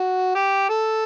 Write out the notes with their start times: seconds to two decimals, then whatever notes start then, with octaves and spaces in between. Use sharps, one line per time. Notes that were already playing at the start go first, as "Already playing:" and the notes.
Already playing: F#4
0.35 G4
0.69 A4